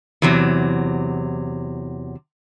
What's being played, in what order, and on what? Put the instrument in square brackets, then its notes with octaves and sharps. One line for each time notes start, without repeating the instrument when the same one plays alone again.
[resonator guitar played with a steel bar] E2 C3 F#3